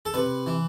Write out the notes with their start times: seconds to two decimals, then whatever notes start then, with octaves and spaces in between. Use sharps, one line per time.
0.05 A4
0.14 C3 B4
0.46 E3